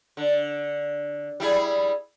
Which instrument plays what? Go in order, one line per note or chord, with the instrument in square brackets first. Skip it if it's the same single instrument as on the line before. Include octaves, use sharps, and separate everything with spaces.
[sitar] D3
G3 E4 G#4